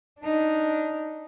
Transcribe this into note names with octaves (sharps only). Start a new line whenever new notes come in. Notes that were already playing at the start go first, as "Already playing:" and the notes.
D4 D#4